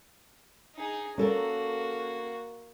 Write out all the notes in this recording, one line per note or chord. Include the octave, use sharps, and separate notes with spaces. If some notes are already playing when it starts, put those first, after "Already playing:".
D#4 G#4
A#3 C#4 F#4 A4 A#4